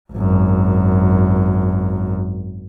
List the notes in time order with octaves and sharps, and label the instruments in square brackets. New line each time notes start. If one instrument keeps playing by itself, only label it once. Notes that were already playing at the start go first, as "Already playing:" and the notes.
[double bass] G#1 F#2